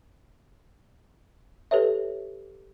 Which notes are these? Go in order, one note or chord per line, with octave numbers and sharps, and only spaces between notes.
G4 A4 B4 C#5 E5